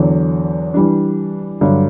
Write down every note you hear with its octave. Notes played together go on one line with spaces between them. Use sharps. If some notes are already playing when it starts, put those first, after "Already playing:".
Already playing: E2 D3 F#3
E3 G3 D4
G2 D3 F#3